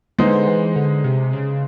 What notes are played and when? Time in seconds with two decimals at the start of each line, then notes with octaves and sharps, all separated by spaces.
0.19 D3 G#3 B3 D#4 G#4 C5
0.47 E3
0.76 D3
1.04 C3
1.33 C#3